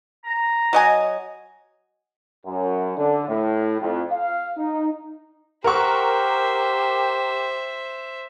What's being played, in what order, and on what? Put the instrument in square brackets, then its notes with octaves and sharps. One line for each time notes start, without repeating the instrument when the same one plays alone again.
[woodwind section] A#5
[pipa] F#3 D#5 G#5
[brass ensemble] F#2
D3
A2
F2
F5
D#4
[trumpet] G4 [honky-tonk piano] A#4 F#5 C#6 [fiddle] C5 E5